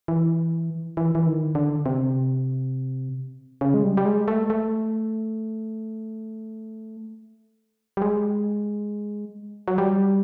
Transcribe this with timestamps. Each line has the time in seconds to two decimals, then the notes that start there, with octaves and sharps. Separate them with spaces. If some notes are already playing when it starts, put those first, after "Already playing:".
0.08 E3
0.97 E3
1.15 E3
1.27 D#3
1.55 D3
1.86 C3
3.61 C#3
3.74 G#3
3.84 G3
3.97 G3
4.05 G#3
4.28 A3
4.50 A3
7.97 G3
8.02 G#3
9.68 F#3
9.78 G3